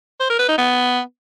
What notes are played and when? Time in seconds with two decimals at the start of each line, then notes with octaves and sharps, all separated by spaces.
0.20 C5
0.29 A#4
0.39 B4
0.48 D#4
0.58 B3